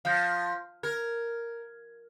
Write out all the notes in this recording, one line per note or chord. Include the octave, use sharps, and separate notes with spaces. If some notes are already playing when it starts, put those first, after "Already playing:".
F3 F5 G6 A#6
A#4 G#6